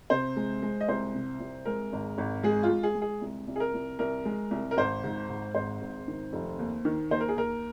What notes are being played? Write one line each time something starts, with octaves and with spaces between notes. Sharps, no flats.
C3 C5
G#3
G#3
D#5
C2 C5
C3
C2
G#3 A#4
G#1
G#1
G#3 G#4
F4
G#3
G#4
G#3
G#4
C2
C2
G#4
A#4
C2
C2 A#4
G#3
C2
A#4
G#1 C5
G#2
G#2
G#1 C5
G#1
D#3
F1
D#2
D#3
D#2 C5
A#4
G#4
D#2 A#4